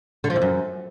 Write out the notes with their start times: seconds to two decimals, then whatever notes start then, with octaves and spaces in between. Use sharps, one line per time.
0.24 D3
0.30 F3
0.36 E2
0.42 F#2